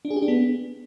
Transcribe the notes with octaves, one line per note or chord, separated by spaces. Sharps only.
D4
G#4
G4
D4
B3